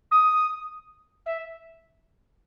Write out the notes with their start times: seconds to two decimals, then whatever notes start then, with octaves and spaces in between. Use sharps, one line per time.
0.11 D#6
1.26 E5